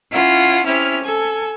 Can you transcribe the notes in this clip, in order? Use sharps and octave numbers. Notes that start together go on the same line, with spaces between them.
C#4 E4 F4 F#5
C3 C#4 E4 F6
A4 G#5